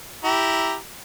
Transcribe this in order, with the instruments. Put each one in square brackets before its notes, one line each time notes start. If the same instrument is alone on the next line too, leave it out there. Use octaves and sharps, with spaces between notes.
[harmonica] E4 G4 A#5